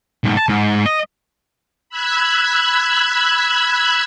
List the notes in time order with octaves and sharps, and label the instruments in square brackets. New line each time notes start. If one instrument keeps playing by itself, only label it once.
[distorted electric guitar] B1 G#2
A5
G#2
D#5
[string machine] B5 E6 F#6 G#6